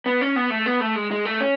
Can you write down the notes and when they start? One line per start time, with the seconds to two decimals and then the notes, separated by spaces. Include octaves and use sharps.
0.06 B3
0.21 C#4
0.36 B3
0.50 A3
0.66 B3
0.81 A3
0.95 G#3
1.11 G#3
1.25 A3
1.40 C#4